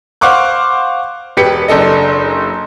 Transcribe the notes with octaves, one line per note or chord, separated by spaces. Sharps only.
C5 F5 F#5 C#6 D6 F#6
E1 G4 B4 B6 C#7
F#1 D4 A4 D#5